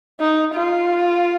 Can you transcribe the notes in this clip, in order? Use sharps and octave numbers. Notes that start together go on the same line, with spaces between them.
D#4
F4